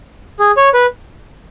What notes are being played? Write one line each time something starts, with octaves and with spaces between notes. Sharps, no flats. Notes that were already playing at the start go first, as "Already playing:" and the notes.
G#4
C#5
B4